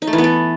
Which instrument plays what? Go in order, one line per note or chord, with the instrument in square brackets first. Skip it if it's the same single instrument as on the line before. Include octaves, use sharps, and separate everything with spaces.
[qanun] D#4
A3
E3
B3
A4